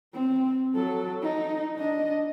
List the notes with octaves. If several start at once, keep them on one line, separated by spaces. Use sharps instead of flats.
C4
F#3 A4
D#4
D4 D#5